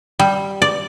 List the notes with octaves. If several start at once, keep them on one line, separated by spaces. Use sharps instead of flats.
G3
D5